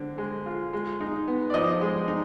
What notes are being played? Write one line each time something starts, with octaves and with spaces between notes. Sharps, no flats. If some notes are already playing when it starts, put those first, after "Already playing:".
Already playing: D3 C4
G#3
F4
G#3
D#4
B3
D5
F3 D#5
G#3
D#4